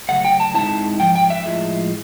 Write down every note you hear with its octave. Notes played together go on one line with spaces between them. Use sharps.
C#3 F#3 A3 F#5
G5
A5
G#2 D#3 G#3 C4 E4 A5
G#2 F3 G5
G5
E5
A2 F3 G#3